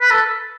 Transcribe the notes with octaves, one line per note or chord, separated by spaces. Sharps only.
B4
A4